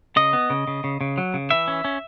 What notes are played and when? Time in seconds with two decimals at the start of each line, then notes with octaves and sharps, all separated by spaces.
0.16 C#3 D#5
0.33 B3
0.50 C#3
0.67 C#3
0.84 C#3
1.01 C#3
1.18 F#3
1.34 C#3
1.51 E3 E5
1.68 C#4
1.85 C#4